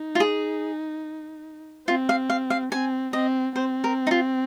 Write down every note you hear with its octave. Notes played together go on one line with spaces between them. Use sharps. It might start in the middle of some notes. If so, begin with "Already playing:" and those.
Already playing: D#4
F4
G#4
C4 F4
F5
F5
F5
C4 G#5
C4 D#5
C4 C5
A#4
D#4
F4